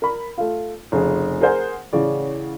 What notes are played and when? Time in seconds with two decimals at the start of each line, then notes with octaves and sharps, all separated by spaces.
0.02 A#4 B5
0.38 A3 F4
0.92 F1 C#3 G#4
1.41 G#4 A#4 C5 F#5 G#5
1.93 A1 C#3 D5